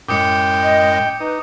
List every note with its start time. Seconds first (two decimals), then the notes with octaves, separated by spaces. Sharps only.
0.09 F#2 A2 G#3 G5 D6 D#6 C#7
0.62 D#5
1.20 D#4 B4